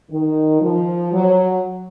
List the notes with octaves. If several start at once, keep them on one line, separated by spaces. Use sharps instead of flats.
D#3
F3
F#3